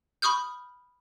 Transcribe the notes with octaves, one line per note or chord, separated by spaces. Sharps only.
B5 C#6 D#6 F6 G6